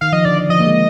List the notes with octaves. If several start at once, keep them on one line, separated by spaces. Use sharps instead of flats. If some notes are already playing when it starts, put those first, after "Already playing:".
D#3 F5
F3 D#5
D3 D5
F3 D#5
A#3
G#3